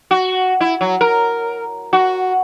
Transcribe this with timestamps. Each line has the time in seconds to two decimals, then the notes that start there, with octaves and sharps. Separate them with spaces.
0.11 F#4
0.61 E4
0.81 F#3
1.01 A#4
1.93 F#4